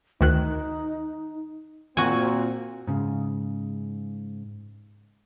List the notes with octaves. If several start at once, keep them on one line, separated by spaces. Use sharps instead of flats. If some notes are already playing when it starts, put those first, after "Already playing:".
D2 D#3 D#4 F#6
A#2 C4 F4 F#4 G#5
G#2 C#3